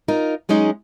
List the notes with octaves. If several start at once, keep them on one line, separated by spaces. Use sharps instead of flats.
D#4 F4 A#4
F#3 G#3 C#4 D#4 G#4